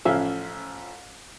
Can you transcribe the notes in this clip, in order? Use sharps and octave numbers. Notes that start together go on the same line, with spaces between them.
A1 F3 C#4 E5 F5